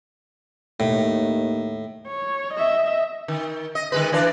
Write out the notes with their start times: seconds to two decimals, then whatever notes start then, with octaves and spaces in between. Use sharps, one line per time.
0.80 D#2 A2
2.07 C#5
2.54 D#5 E5
3.28 D#3
3.75 D#5
3.92 D#3 G#3 B4
4.12 E3 D4 D5